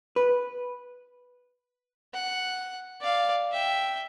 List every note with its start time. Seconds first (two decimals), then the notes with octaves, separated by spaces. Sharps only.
0.16 B4
2.14 F#5
3.01 D5 F5
3.51 E5 G5